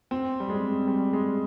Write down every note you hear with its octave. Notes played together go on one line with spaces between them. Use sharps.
C4
G3
G#3
G3
G#3